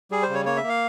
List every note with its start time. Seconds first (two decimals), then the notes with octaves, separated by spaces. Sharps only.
0.11 G3 G#4
0.23 C5
0.29 C#3
0.34 C#5
0.46 A#3 C#5
0.57 E5
0.63 A#3
0.69 F5